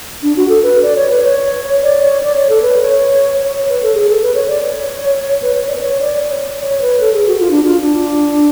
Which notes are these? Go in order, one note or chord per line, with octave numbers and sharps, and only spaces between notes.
D4
F#4
A4
B4
D5
C#5
B4
C#5
D5
C#5
D5
C#5
A4
B4
C#5
C#5
C#5
B4
A4
G#4
A4
B4
C#5
D5
C#5
B4
C#5
D5
B4
C#5
D5
C#5
C#5
B4
A4
G#4
F#4
F4
D4
F4
D4